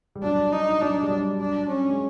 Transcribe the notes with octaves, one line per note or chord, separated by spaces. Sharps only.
G3
F#3 D4
D#4
F#3 D4
G3
F#3
D4
C#4
G#3